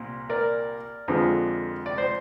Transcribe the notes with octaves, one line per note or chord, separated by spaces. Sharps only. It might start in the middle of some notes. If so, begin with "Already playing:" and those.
Already playing: C2 A#2
A#4 D5
F2 D3 F3 G#3
D5
C5